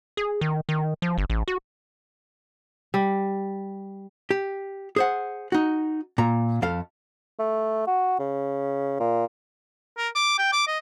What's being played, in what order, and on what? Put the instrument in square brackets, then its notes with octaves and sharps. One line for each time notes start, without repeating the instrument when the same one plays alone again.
[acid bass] G#4
D#3
D#3
F3
G1
A1
F#4
[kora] G3
[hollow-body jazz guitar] G4
G#4 C5 F#5
D#4 F#4
A#2 A#5
F2 A4 F5
[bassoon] A3
F#4
C#3
A#2
[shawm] A#4
D6
G5
D6
D#5